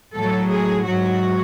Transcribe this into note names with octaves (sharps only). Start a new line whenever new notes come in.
A2 F#3 A4
G#4
G#2 F#3 F#4